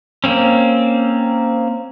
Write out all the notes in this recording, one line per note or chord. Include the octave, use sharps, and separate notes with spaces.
A#3 C4 C#4